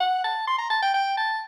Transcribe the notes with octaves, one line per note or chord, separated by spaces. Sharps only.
F#5
A5
C6
A#5
A5
G5
G5
A5